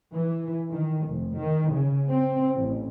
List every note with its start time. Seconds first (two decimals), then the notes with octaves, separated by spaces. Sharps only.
0.13 E3
0.71 D#3
1.08 F1
1.38 D#3
1.72 C#3
2.09 C4
2.55 A1